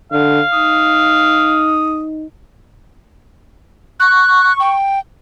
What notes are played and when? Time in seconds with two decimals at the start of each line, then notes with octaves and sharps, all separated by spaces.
0.12 D3 F5
0.53 D#4 D#6
4.00 C#6 F#6
4.60 G5